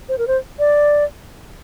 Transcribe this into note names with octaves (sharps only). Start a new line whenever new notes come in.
C5
A#4
C5
D5